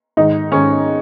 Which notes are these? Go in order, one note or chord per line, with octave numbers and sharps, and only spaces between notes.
G#2 D#3 D#4
G#2 D#3 C#4